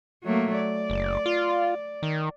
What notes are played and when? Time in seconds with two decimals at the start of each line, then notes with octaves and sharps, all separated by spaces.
0.24 F#3 A3 A#3
0.56 D5
0.90 F#1
1.26 F4
2.03 D#3